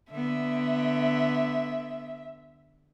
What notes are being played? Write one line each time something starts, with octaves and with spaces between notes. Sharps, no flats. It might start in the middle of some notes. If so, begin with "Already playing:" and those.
D3 B3 E5